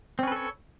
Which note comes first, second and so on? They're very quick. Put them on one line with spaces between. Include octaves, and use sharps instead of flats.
C4 C#4 B4 A4 C#5